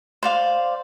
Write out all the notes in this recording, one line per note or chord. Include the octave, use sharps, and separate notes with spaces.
C5 D5 F5